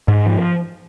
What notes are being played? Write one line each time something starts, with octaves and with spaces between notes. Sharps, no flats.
G#2
F3